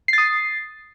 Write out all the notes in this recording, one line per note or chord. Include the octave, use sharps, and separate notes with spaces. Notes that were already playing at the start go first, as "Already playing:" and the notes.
D#6 A6 C7